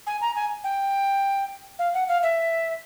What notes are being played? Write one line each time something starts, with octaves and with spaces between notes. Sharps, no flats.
G#5
A#5
G#5
G5
F5
F#5
F5
E5